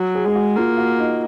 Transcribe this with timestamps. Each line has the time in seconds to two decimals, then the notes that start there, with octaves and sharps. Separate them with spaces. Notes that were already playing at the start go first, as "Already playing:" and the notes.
Already playing: F#3 F#4
0.15 G#4
0.25 G#3 G#4
0.35 F#4
0.57 A#3 F4
0.78 F#4
0.99 D#4